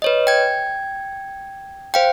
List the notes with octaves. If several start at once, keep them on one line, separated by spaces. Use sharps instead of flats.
B4 C#5 D#5
G5 G#6
C5 F5 G5